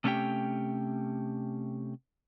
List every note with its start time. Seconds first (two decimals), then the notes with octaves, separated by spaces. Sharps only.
0.04 C3 A3 C#4 D#4 G4 G5